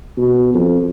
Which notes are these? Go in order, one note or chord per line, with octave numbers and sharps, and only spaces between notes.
B2
F2